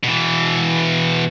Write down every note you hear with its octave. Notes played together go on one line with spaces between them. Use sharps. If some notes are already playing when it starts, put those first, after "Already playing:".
B2 E3